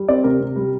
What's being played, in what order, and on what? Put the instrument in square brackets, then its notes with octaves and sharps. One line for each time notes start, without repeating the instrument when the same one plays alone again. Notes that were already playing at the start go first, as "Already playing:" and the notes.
Already playing: [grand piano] G3
C4 D5
C3 A#4
C3
G3